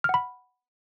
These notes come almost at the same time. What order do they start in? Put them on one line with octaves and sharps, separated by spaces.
F6 F#5 B5